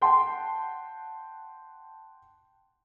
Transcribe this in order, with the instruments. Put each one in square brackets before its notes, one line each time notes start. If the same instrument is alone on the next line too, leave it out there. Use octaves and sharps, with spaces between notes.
[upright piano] F#5 G5 A5 C6